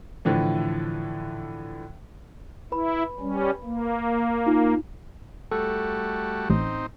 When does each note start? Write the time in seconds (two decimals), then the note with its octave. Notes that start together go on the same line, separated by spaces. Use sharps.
0.25 A2 D3 E3 F3
2.72 E4 B4 B5
3.20 G3 C#4
3.64 A#3
4.46 D#4 F4
5.51 G3 A3 F#4 A4
6.50 A1 C4 D#4